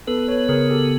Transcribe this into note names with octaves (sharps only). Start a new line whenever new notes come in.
B3 A4 B4
B4 C#5
C#3 G#4 A#4
G4 A4